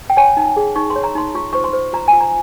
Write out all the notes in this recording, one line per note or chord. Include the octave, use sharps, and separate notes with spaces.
G5
C#5 G#5
D#4
G#4
D#4 C#6
C6
C#5
A#5
D#4 C6
F4 C#6
C5 C#6
C6
C5
F4 A#5
G#5
F4
A#5